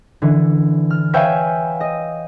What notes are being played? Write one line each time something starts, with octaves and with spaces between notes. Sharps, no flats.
D3 E3
F6
B4 C#5 E5 F5 G5 G#5
D#5